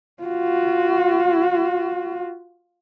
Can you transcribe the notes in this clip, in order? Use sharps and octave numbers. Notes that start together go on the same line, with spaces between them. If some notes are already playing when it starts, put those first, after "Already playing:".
F4 F#4